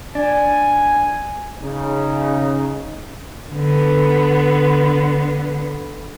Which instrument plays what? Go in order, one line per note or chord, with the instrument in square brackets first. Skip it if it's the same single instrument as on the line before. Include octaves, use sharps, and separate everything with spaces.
[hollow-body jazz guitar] D4 [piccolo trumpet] G#5
[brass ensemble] C#3 D#4
[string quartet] D3 B3